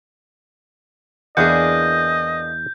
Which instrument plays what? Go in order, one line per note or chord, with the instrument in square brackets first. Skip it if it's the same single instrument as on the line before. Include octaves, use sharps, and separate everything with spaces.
[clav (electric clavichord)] E2 E3 F#5 [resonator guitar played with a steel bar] A#3 D4 G#4 [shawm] D#5 [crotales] G6